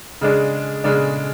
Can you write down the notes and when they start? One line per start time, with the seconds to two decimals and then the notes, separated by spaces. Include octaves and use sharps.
0.21 C#3 G#3 D4
0.84 C#3 G#3 D4